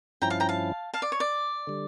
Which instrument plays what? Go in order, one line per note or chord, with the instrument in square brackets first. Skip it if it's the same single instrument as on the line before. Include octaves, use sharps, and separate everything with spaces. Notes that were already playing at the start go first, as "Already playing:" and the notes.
[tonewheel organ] G2 F3 C#4 E4 [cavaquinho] G5 A#5
[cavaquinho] F5 A5
G5 A#5
F5 A5
F5 A5
D5
C#5
D5
[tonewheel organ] D3 G3